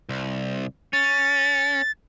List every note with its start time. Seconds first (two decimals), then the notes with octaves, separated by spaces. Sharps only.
0.09 C2
0.93 C#4 A6